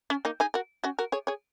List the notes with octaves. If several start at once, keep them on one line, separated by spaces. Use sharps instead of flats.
C#4
A#3 D#4
D#4 G#4
F#4 A#4
C#4 F#4
F#4 A#4
G#4 C#5
G#4 C#5